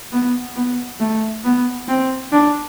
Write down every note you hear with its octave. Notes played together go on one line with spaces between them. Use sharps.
B3
B3
A3
B3
C4
D4